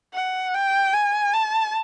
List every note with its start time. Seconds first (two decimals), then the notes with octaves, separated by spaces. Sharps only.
0.14 F#5
0.54 G5
0.93 G#5
1.33 A5